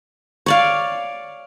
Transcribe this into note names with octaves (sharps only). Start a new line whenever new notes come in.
C#5 D5 F5